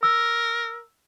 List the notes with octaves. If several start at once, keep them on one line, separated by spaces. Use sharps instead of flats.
A#4 E6